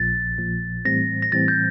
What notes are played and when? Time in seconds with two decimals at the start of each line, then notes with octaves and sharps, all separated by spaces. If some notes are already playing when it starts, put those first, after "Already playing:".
Already playing: A#1 A#2 F3 A6
0.38 A#1 A#2 F3
0.85 A2 E3 G3 C4 A#6
1.22 A#6
1.32 A2 E3 G3 C4 A6
1.48 G6